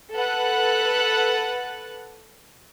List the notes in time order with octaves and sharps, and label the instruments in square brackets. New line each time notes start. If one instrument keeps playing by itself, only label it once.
[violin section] A4 B4 F#5 F#6 A6